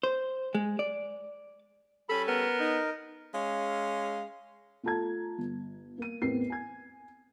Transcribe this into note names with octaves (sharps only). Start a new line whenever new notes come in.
C5
G#3
D5
G3 C#4 A4 B5
B3 A#4
D#4
G#3 C#4 F5
A3 F4 A4 A5 A#5 G#6
G1
A#3 D#7
A1 E2 B3 C4 A#4 C7
G#5 G#6